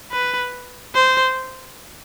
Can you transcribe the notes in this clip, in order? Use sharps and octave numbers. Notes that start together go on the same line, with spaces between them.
B4
C5